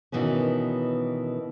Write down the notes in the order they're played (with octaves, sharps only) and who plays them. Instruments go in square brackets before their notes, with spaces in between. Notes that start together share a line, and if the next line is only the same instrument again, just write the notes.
[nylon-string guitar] B2 D#3 E3 B3 C#4